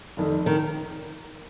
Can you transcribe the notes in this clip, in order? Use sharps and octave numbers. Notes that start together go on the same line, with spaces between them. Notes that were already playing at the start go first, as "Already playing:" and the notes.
F1 F2 D#3
D#3